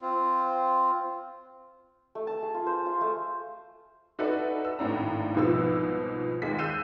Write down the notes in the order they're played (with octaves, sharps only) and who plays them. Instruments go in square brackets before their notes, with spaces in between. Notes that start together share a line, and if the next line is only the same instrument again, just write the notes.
[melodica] C4 F4
[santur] A3
A5
G#4
F4
C5
F4
A3
[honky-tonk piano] D#4 F#4 A4 B4 D5 E5
E6
G#1 A2 D4 A#5
C2 G#2 B2 F3 E6
D#2 G#3 B6
E6 F#6 G6 C7 D#7 E7